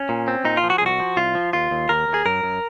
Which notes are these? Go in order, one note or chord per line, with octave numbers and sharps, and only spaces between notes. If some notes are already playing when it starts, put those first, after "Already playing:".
Already playing: C#4
A#2
C4
A#2 D#4
F4
F3
F#4
G#4
C2 F#4
F3
C2 F4
F3
D#2 F4
D#2
D#2 A#4
D#2
G#4
F#2 A#4
F#2